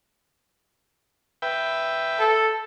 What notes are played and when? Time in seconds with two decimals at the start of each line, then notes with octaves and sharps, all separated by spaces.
1.42 B4 E5 G5
2.19 A4